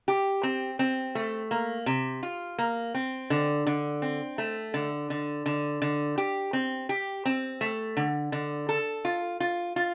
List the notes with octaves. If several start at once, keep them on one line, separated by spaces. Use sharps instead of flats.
G4
C4
C4
A3
A#3
C3
F4
A#3
C4
D3
D3
C4
A3
D3
D3
D3
D3
G4
C4
G4
C4
A3
D3
D3
A4
F4
F4
F4